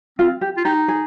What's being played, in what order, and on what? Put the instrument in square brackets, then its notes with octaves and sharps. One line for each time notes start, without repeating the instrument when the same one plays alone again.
[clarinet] C4 [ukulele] F4
[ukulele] G4
[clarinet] F4
[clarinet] D#4 [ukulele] G4
[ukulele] G#4